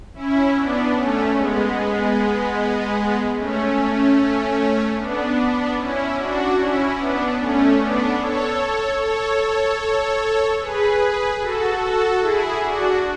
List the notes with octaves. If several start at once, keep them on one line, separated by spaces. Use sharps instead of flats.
C#4 E4
B3 D4
A3 C#4
G#3 B3
A3 C#4
B3 D4
C#4 E4
D4 F#4
C#4 E4
B3 D4
A3 C#4
B3 D4
A4 C#5
A4 C#5
G#4 B4
F#4 A4
F#4 A4
E4 G#4
D4 F#4